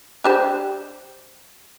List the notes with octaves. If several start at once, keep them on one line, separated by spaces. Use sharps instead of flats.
D4 G4 C5